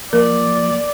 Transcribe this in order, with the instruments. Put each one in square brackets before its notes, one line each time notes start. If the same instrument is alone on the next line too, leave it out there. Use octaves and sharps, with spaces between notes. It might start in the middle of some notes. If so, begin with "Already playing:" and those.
[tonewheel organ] F3 [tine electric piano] A#3 [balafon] A#4 [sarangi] D5